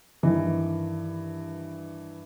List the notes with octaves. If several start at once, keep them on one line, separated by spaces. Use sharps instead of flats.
G2 D#3 E3